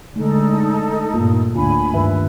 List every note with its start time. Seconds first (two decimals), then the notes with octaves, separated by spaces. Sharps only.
0.16 D3 G#3 A3 D#4 A4
1.14 G2 A#2 A#3 F4
1.56 D2 A2 D4 F4 G#5 B5
1.94 G2 D#3 B4 E5